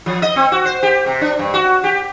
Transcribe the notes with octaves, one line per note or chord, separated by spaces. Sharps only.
F3
D#5
C4
F#4
C5
G4
C3
D4
G2
F#4
G4